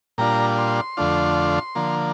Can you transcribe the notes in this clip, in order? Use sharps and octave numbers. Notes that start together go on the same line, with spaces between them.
A#2 G3 D4 F4 A#5
C6
F2 D3 A3 D4 F4
D3 F3 A#3